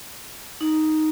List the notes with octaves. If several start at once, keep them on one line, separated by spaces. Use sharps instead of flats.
D#4